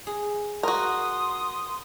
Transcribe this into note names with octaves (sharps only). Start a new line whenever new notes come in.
G#4
F#4 A#4 C6 D#6